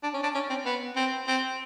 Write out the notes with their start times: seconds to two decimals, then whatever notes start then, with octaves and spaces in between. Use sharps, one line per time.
0.03 D4
0.14 C#4
0.23 D4
0.34 C#4
0.50 C4
0.65 B3
0.96 C4
1.27 C4